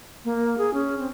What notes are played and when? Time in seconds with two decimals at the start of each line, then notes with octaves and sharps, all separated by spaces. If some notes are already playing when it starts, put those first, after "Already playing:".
0.25 A#3
0.58 G#4
0.74 C#4
0.99 C4